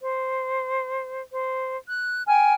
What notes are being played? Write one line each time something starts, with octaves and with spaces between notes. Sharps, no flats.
C5
C5
F#6
G5 G#5 F6